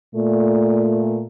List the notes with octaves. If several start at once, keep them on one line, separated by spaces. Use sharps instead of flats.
A#2 A3